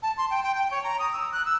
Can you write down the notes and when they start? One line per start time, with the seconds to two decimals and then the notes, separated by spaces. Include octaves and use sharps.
0.02 A5
0.17 C6
0.30 G5
0.43 G5
0.55 G5
0.71 C#5
0.83 A#5
0.99 D#6
1.13 E6
1.32 F#6
1.45 E6